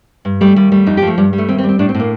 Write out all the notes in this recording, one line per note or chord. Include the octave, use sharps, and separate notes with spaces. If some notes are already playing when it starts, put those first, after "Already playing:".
G2
G3 A3
D#2 G3
G3 A3
F2 D#4
F3 G4
A3
G2 G3
G3
A3
D#2 C4
C4
G3
C4
A2 D4
C4
A2
A#3